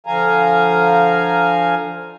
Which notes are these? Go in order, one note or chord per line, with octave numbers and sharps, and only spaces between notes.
D3 F3 F5 G#5 A#5